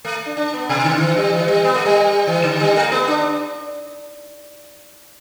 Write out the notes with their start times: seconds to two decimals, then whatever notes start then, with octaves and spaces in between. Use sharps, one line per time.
0.05 A3
0.26 D4
0.37 D4
0.54 B3
0.69 B2
0.84 D3
1.01 E3
1.16 G3
1.33 E3
1.48 G3
1.64 B3
1.74 A3
1.85 G3
2.27 E3
2.44 D3
2.60 G3
2.76 A3
2.92 B3
3.07 D4